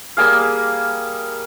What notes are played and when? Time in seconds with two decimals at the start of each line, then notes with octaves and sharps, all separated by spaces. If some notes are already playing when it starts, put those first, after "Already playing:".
0.17 G3 A#3 G#4 F5